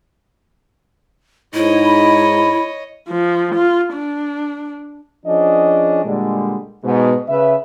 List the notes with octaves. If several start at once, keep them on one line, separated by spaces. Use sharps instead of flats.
G#2 D#4 E4 C#5 D#5
B5
F3
F4
D4
F3 C#4 D4 G#4 D#5
A#2 D3 G3 G#3
G#2 B2
C#3 B4 E5